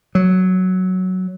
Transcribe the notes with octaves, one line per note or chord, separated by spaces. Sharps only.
F#3